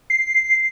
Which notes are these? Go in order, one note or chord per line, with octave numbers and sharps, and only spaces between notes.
C7